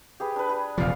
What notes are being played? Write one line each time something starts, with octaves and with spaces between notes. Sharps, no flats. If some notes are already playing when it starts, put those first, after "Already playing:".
G4 G#4 B4
D4 B4
G#4
D#1 C3 F3 D5 F5